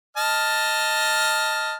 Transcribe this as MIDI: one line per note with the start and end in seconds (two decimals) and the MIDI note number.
0.17 1.76 75
0.17 1.76 81
0.17 1.76 89